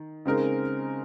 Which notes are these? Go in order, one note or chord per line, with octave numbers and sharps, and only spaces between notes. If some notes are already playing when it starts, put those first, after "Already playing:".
Already playing: D#3
C#3 G#3 C4 D#4 A#4